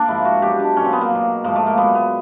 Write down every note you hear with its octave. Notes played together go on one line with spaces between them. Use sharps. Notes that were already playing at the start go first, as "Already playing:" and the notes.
Already playing: A#3 D4
G#2 F3 E4
F#4
B2 F#3 G4
D4
A#2 F#3 C#4
C4
B3
A#3
B2 F#3
G#2 F3 A#3
A3
A#3
A#2 F#3 B3
B3